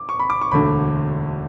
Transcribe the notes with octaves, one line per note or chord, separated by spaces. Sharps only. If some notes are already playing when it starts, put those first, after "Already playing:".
Already playing: D6
C#6
B5
D6
C#6
E1 D2 D3 B5